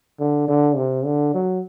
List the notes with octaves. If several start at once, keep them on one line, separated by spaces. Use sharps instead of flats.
D3
D3
C3
D3
F#3